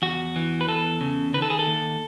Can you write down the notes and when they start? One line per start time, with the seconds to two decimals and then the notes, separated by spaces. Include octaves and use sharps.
0.02 E2 F#4
0.36 E3
0.61 B4
0.68 E2 A4
1.01 C#3
1.34 D#3 B4
1.42 A4
1.50 G#4
1.59 A4
1.67 D#2